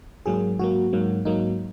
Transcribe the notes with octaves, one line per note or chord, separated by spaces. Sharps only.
G#2 F#3 A#3 G#4
G#2 F#3 A#3 F#4
G#2 F#3 A#3
G#2 F#3 A#3 D#4